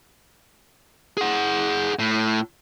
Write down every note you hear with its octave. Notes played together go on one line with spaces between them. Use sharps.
G#4 F#5
A2